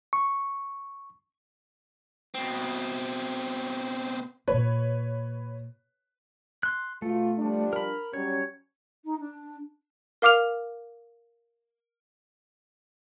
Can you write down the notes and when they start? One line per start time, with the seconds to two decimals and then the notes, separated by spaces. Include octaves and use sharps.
0.13 C#6
2.35 B2 C4
4.48 A#2 A#3 B4 C#5
6.63 C6 F#6
7.02 B2 A3 F4
7.37 F3 G3 D4
7.73 A#4 B5
8.13 F#3 G3 C#4 C#5
9.04 D#4
9.19 D4
10.22 A#4 F5 D6 F6 F7